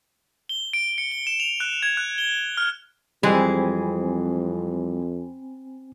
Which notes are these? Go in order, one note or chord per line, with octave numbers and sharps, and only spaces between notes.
G7
D7
C#7
G7
E7
F7
F#6
G#6
F#6
G7
F6
F2 E3 G3 G#3 C4 G#4 G#5 B5